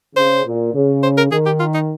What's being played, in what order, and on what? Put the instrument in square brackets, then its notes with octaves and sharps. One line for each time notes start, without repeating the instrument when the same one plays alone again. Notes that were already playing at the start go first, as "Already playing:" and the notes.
[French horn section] C#3 [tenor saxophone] C5
[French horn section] A#2
C#3
[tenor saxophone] C5
A#4
[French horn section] D#3 [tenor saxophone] G#4
[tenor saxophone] G4
F4
D#4